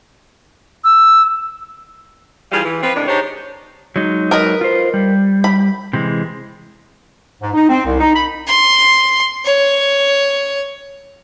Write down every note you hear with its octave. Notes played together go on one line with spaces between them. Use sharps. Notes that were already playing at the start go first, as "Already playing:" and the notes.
E6
E3 F3 G3 F4 G#4 F5
E3
F3 C4 F4 B4
A2 C3 D#3 D4
D4 D#4 G4 G#4 C5 C#5
F#3 G#3 D#4
A#4 B4 D#5
F4 C5
G3
B5
C3 E3 G#3
G#2
D#4
C4
C2
D#4
B5
C6
C#5